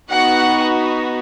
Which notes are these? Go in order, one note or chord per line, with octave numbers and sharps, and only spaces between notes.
B3 D#4 F#4 F#5